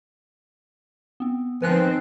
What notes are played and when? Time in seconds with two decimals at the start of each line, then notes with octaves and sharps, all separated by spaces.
1.20 B3 C4
1.62 D#3 F3 C4 B4 G#5 F#6